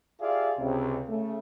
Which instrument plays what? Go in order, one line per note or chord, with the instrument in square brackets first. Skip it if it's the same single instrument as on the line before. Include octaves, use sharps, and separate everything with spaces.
[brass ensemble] F4 G4 G#4 D5 E5 F5
C#2 C3
C#3 A3